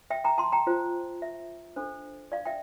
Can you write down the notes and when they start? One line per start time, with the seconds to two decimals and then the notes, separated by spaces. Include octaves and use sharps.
0.10 E5 G5
0.24 G5 A#5
0.38 A5 C6
0.52 G5 A#5
0.67 F4 C5
1.22 E5
1.76 D4 A4 C5
2.32 D5 F5
2.46 E5 G5